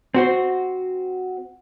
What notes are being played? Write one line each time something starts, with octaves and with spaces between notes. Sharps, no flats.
C4 F#4 C5